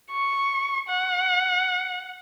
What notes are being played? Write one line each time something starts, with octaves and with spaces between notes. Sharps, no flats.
C#6
F#5